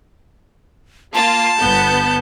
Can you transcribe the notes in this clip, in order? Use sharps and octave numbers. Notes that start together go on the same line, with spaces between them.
A#3 F4 A5
G1 B3 G6